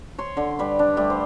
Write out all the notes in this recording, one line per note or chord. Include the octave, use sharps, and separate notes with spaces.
C#5 C6
D3
G3 B4
D4
G3 A3
C5